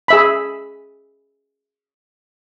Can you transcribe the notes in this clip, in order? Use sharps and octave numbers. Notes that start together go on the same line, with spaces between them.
G#4 E5 B5